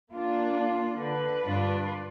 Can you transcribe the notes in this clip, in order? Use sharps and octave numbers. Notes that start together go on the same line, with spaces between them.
A#3 D4 F4
D3 B4
G2 D4 F4